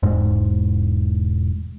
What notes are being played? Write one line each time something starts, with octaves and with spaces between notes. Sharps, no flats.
E1 G#2